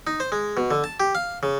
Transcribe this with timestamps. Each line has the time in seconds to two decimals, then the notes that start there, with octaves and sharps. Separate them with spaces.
0.07 D#4
0.20 C5
0.32 G#3
0.57 B2
0.71 D3
0.84 A5
1.00 G4
1.15 F5
1.43 C#3